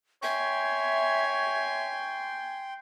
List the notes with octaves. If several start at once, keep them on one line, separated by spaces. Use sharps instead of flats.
C#5 E5 G5 G#5 C6